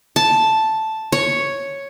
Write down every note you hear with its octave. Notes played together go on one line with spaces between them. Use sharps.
A5
C#5